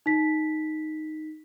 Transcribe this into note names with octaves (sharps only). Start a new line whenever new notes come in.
D#4 B6